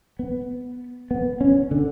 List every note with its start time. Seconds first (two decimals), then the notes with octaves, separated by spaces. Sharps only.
0.19 B3
1.11 B3
1.41 C#4
1.71 D3